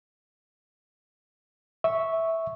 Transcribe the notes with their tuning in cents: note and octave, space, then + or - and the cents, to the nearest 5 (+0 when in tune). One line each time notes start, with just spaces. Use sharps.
E5 -10 C#6 +0